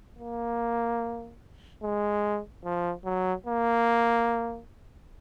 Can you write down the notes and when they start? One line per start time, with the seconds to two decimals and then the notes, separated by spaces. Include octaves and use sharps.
0.19 A#3
1.82 G#3
2.64 F3
3.05 F#3
3.46 A#3